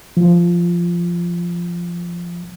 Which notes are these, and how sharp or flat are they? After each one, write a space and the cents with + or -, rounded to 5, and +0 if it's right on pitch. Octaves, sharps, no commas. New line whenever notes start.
F3 -10